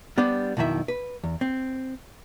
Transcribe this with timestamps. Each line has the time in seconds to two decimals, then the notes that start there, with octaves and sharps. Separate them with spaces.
0.18 G3 B3 D4 C5
0.57 B1 F2 D#3 E4 E5
0.88 B4
1.24 E2
1.41 C4